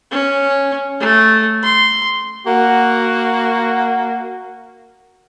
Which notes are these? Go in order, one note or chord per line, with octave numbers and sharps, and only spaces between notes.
C#4
A3
C6
A#3 F#4